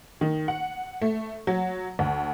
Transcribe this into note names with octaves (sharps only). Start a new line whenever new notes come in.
D#3
F#5
A3
F#3
D2